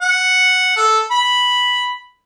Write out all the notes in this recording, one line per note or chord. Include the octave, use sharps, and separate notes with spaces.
F#5
A4
B5